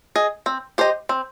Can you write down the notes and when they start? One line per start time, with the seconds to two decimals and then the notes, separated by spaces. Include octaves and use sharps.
0.16 G#4 D#5
0.46 C4
0.78 G4 C5 D#5
1.09 C4